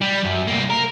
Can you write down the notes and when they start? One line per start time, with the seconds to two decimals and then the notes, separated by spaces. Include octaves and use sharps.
0.02 G3
0.25 F#2
0.48 C2 A#3
0.70 A#4